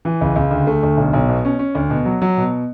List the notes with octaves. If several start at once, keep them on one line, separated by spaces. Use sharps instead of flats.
E3
C#2
C#2
D2
A3
D2
B1
B1
B2
C#4
C#4
D2
B2
F#3
F#3
B2